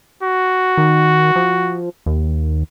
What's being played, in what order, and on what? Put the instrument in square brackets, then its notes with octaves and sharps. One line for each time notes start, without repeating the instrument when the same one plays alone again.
[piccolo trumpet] F#4
[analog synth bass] D#3
F3
D#2